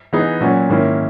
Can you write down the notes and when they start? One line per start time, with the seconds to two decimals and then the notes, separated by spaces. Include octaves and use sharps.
0.13 E3 B3 D#4 G#4 B4
0.41 A#2 F#3 C#4 F#4
0.69 G#2 D#3 A#3 C#4 E4